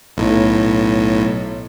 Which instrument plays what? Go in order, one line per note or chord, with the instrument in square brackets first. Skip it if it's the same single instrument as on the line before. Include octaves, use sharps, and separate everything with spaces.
[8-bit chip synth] B1 A2